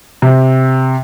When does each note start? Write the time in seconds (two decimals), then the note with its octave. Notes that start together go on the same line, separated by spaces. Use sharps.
0.22 C3